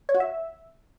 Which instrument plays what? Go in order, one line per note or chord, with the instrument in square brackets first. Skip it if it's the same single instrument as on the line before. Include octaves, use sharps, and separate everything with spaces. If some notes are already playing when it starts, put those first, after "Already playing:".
[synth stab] C#5
F#4
E5